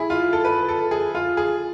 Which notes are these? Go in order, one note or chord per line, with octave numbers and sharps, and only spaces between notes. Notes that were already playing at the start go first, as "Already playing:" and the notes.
Already playing: E4 G#4
F4
A4
B4
A4
G#4
F4
G#4